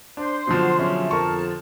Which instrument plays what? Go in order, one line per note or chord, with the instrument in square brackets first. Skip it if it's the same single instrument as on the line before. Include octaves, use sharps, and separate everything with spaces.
[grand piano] D4 [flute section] C5 C6
[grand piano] B2 D3 F3 [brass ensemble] F#3 F4 F#4
[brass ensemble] F#3 G#4 E5 [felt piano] C#4
[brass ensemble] F2 [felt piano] A#4 C#6 [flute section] A5